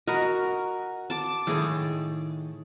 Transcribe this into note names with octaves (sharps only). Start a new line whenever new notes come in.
F#4 A#4 D#5 B5
A5 D6
A2 D#3 G#4 A4